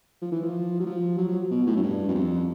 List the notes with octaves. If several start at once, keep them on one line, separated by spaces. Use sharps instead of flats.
F3
E3
F3
F#3
F3
F#3
F#3
B2
A2
F#2
G2
F#2
F2